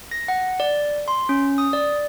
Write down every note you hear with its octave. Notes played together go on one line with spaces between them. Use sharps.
A#6
F#5
D5
C6
C#4
D#6
D5